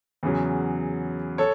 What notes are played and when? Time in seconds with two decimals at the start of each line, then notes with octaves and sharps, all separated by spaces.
0.23 E2 C#3 F#3
1.38 A4 C#5